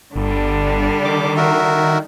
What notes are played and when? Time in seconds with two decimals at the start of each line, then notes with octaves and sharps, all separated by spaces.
0.16 G1 D3 G3 D4
1.05 D#3 D6
1.37 F#4 A#4 E5